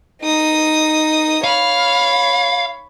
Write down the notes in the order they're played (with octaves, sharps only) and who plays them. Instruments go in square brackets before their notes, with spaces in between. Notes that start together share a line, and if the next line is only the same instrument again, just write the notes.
[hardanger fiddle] D#4 D#6
[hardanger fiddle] C#5 B5 [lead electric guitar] F5